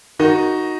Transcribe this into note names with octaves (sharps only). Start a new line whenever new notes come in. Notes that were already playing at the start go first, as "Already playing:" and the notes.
D#3 D#4 F#4